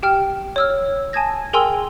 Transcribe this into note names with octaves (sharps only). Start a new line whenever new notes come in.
G4 G5 F6
C#5 E6 F6
G#5 A5 D#6 G#6 A#6
G#4 A#4 G5 G#5 C6 E6